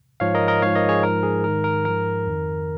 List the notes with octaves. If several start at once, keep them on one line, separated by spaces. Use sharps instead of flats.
G#2 F3 C#5 F5
A#4 D#5
A#4 D#5
G#2 F3 C#5 F5
A#4 D#5
G#4 C#5
G#2 F3 A#4
G#4
G#2 D#3 A#4
A#4
G#2 F3 A#4
F2 D#3